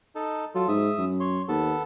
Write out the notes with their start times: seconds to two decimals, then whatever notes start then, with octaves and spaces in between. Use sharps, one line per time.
0.15 D#4 A4
0.55 F#3 F4 A4
0.68 G#2 E5 D#6
0.98 F#2
1.20 C#5 C6
1.48 D#2 B3 A4